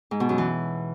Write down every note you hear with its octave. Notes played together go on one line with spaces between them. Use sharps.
G#2
B2
F#2
E3